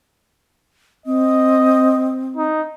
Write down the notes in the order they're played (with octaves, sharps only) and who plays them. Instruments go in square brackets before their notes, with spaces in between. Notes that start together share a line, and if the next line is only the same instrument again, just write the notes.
[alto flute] C4 [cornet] D#5
[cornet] D#4